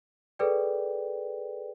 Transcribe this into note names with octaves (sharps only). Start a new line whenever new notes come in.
G#4 A4 B4 D5 G5